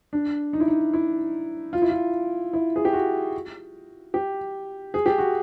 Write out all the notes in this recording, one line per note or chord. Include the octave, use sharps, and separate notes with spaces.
D4
D#4
E4
D#4
E4
F4
E4
F4
E4
G#4
G4
F#4
G4
G#4
G4
F#4